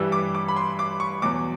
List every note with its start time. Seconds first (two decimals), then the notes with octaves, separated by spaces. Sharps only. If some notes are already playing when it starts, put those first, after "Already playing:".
Already playing: G2 E3 G3 E6
0.12 D6
0.35 D6
0.48 B5
0.56 C6
0.79 D6
1.00 C#6
1.22 E2 B2 F#3 D6